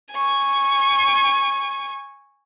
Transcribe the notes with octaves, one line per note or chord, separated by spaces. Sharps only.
G#5 C#6